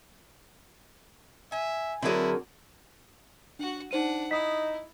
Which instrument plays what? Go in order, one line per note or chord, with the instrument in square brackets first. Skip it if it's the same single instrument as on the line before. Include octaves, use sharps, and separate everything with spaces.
[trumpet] E5 [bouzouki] G#5
[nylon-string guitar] D3 F#3 D5 [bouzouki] C4 G#4 [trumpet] E4 [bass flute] A#4
[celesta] D4 [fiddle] F#4 F#5
[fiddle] D4 F#5 [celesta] D#4 C5 D#7
[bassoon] D#4 [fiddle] E4 [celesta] D#6 B6